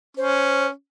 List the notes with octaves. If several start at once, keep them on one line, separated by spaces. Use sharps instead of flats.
C#4 C5